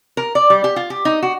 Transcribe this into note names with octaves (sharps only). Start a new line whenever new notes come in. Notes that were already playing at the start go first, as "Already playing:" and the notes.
A#4
D5
G3
G4
F4
G4
D#4
F#4